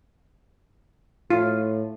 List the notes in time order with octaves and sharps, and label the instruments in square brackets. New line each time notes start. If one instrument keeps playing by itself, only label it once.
[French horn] A2 [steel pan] F4